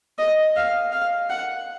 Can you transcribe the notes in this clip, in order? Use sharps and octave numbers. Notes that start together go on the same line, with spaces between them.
D#5
F5
F5
F#5